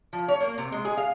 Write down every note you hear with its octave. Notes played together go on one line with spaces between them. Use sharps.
F3
C#5
A#3
C3
G#3
G#4
F5